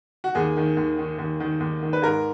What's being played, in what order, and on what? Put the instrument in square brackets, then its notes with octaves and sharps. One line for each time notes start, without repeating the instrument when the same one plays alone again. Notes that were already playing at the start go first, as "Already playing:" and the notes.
[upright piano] F#4
D#2 G#4
D#3
D#2
D#3
D#2
D#3
D#2
D#3
B4
G#2 A#4